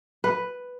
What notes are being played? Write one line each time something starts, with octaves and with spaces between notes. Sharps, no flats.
B4